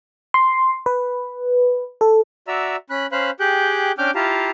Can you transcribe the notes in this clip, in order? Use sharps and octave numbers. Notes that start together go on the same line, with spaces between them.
C6
B4
A4
F#4 D5 E5 A#5 E6
C#4 B5 F#6
C#4 C5 F5 B5 F#6
G4 G#4 G5 F#6 G6
C#4 D4 G5 D6 F6 G6
E4 F4 G4 F5 A5 A#5